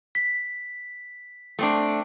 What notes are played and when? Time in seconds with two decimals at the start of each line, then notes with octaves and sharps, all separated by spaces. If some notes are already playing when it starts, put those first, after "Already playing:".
0.15 B6
1.59 A3 C4 D4